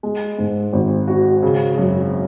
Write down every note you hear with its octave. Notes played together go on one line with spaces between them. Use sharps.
G#3
G#2
G#1
F#4
C#3
F#2